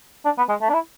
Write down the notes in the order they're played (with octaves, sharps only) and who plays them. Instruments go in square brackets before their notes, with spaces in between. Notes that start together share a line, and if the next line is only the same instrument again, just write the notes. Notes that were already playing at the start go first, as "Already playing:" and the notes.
[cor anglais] D4
B3
G#3
A3
D4
E4